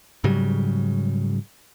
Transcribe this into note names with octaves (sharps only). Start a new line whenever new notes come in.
G#2 C#3 F#3 G3